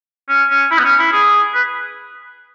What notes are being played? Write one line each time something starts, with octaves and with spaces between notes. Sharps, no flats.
C#4
C#4
E4
B3
C#4
E4
G#4
B4